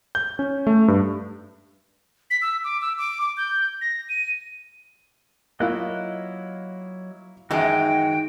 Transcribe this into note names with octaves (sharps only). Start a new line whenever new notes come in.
G6
C#4
A3
G2
B6
E6
D6
E6
D6
D6
G6
A#6
D#7
F#3 A#3 E4 F4 D#5 F#6
F#2 D#3 E3 G#3 D#4 F#4 G5